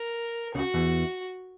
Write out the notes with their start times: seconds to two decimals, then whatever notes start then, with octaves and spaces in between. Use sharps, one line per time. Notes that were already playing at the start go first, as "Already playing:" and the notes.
Already playing: A#4
0.54 C#2 C#3 F#4
0.74 E2 E3